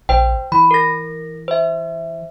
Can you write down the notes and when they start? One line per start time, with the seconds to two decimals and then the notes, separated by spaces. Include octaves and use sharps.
0.09 A#1 C5 G5
0.52 E3 B5
0.71 A#4 A#6
1.48 C5 E5